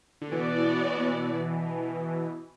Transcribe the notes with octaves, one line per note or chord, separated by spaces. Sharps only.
D3
B2 E3 B3 F#4 D5